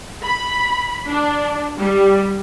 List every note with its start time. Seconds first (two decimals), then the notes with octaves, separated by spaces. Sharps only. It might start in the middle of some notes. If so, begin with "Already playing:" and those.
0.22 B5
1.08 D4
1.78 G3